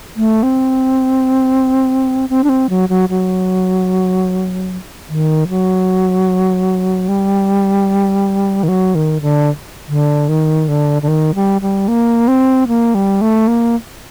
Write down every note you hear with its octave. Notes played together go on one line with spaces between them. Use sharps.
A3
C4
C4
D4
C4
F#3
F#3
F#3
D#3
F#3
G3
D#3
F#3
D#3
D3
D3
D#3
D3
D3
D#3
G3
G3
A#3
C4
A#3
G3
A3
A#3